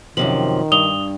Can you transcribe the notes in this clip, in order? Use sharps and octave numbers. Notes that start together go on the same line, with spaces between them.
F#2 C3 D#3 F3 F#7
G2 D#6 F7 G7